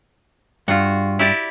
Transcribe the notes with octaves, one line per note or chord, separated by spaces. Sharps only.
G2 F4 F#4
E4 G4 D5